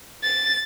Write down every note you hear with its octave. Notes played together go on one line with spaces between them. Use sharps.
A6